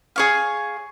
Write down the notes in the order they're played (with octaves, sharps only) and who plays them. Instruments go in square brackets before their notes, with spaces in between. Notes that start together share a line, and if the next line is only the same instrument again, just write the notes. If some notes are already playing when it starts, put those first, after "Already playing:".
[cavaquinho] G#4 C#5 F5